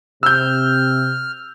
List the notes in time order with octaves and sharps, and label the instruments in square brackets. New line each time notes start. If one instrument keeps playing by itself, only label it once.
[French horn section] C3 [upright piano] E6 G6 [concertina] F6